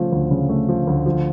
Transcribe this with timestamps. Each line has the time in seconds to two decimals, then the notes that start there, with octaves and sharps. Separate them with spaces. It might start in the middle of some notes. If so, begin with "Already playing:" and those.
Already playing: C#3 F3 A3
0.12 D2
0.31 C#3
0.49 A3
0.69 F3
0.87 D2
1.06 F3